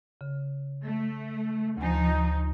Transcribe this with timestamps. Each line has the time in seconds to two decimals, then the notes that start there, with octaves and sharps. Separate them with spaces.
0.21 C#3
0.84 A3
1.77 D2 F3 D#4 G#5